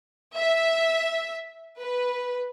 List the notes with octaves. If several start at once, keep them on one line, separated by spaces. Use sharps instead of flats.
E5
B4